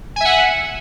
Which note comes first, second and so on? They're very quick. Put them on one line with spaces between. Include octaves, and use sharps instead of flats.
G#5 E5 F#5